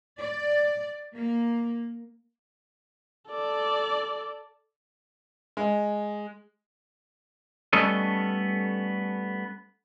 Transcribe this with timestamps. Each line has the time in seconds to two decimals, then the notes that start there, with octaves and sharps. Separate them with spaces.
0.19 D5
1.15 A#3
3.31 A4 D5
5.57 G#3
7.73 G3 A3 B3 C#4 A4 D#5